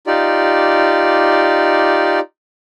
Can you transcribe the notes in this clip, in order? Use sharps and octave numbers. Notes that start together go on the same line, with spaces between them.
D#4 F4 G4 D5